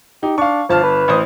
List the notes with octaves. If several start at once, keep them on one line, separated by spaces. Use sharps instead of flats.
D#4 G4
D4 F5 C#6
G1 F3 A5 F6
B4
A1 C5 D#6